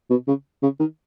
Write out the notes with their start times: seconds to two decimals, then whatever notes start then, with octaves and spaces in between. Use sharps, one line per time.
0.10 B2
0.28 C#3
0.62 C#3
0.79 D#3